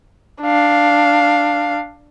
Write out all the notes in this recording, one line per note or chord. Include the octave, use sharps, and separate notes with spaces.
D4 F5